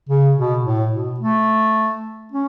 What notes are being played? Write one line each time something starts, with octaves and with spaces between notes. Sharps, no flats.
C#3
B2
A2
B2
A3
C#4